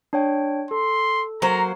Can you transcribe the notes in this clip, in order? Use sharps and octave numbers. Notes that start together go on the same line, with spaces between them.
D4 C#5 G5
A4 C6
F#3 A#3 C5 A#5